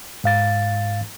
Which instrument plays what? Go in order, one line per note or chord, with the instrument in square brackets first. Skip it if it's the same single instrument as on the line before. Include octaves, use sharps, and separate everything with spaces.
[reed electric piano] G#2 F5 A6